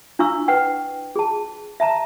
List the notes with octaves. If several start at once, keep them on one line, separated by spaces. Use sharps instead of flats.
D4 E4 F5 C#6 E6
B4 F#5 G5
G#4 A5
E5 A5 A#5